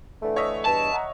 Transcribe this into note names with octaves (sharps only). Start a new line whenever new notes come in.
D3 E3 A3
C#5 D#5 E5
E2 G2 A5
F#5 A#5